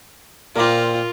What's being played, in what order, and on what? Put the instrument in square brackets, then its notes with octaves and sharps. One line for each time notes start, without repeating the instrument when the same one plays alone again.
[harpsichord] A#2 C4 [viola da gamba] F4 [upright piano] A#4 D6